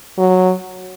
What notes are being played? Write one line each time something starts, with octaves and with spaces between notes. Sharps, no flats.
F#3